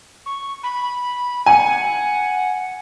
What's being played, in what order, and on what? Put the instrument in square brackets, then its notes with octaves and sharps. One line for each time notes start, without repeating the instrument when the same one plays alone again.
[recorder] C#6
B5
[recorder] F#5 [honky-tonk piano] G#5